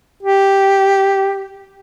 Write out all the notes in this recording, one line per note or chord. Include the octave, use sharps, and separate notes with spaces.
G4